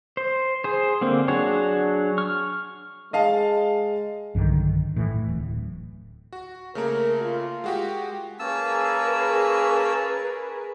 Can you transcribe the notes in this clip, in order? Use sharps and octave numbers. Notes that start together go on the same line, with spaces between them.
C5
G#4 C5
D3 A#3 C4
F#3 D4 F#4 G#4 C#5
C#6 F6
G#3 D#5 F5 A5
B1 G2 D3 D#3
A2 E3
D1
F#4
C#3 A3 A#3 A#4
F4
G#3 F#4 G4
A#3 C#4 G#4 A#4 B4 A5 E6